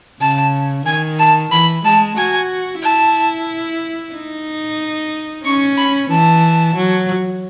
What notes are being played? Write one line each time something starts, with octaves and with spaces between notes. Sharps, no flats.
C#3 A5
D#3 G#5
A5
E3 B5
G#3 A5
F#4 G#5
E4 A5
D#4
C#4 C#6
B5
E3 A5
F#3